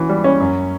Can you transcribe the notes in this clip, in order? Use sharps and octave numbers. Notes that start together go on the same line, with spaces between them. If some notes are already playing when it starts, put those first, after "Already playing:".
Already playing: E3 C#4 F#4
G3
C#4
F#2